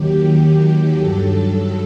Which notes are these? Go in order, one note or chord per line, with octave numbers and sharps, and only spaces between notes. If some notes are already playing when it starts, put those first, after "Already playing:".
Already playing: D#2 D#3 F#3 G4
G2 F#3 A4